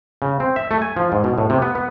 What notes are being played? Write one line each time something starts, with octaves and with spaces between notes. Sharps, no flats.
C#3
C4
E5
A3
G#5
F3
G#2
B2
A2
C3
B3
B3